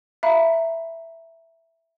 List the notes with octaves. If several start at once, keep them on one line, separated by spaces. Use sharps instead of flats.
E5 F5 A#5 B5